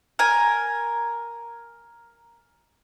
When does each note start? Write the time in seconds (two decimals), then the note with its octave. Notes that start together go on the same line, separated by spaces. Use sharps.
0.19 A#4 G#5